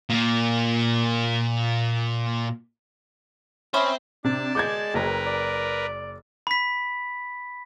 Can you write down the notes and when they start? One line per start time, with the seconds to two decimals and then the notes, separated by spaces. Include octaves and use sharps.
0.10 A#2 A#3
3.74 C4 C#4 C5 E5 B5 D#6
4.24 C3 D4 D5 A5
4.55 G#3 D6 G6 G#6
4.94 F#1 A#4 B4 A#5
5.26 D5
6.47 B5 B6